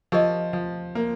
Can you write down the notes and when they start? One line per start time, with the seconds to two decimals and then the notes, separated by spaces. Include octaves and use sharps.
0.12 F3 G4 A#4 D#5
0.53 F3
0.95 A#3